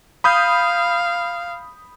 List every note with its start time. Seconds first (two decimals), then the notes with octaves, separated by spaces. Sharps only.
0.24 F5 B5 D#6 G6